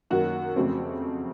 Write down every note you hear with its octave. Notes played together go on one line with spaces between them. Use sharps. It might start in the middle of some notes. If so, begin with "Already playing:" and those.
F#2 D#3 F#3 A#3 F#4
F2 C#3 F#3 A3 C4